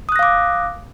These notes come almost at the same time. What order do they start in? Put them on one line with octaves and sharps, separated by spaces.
D#6 F#6 A#6 F5 D6